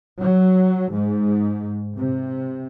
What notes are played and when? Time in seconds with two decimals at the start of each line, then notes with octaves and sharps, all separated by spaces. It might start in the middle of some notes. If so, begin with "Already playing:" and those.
0.20 F#3
0.93 G#2
1.97 C3